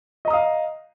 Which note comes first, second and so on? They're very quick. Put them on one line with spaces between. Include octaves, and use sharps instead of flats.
D#5 A#5 D#6 F5